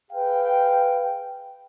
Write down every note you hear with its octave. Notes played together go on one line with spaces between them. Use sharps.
G#4 B4 F5 G5